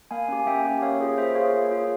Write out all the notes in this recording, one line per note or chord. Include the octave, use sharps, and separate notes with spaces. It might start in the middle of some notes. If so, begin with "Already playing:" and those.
A#3 F5 G#5
C#4 G4
G#5
A#3 E5 G5
C#4 G4
A#3 C#5 F5
F4 G#4
A#3 C5 E5
F4 G#4 C#5 F5
A#3
F4 G#4